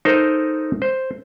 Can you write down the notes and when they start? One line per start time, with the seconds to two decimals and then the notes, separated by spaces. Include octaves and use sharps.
0.05 D#4 A4 A#4 C5 D#5
0.82 C5